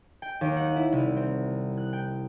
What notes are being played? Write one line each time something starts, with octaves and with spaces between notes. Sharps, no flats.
G5
D#2
F#5
E4
C2
C4
F#6
G5